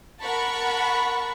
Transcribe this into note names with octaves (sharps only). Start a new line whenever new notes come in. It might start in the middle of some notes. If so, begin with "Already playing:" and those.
A#4 F#5 A5 B5 C#6